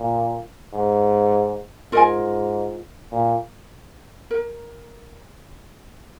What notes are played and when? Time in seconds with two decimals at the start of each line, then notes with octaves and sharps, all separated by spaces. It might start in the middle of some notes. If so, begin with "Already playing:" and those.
Already playing: A#2
0.73 G#2
1.92 G#2 F4 A#4 D#5 G#5
3.12 A#2
4.31 A#4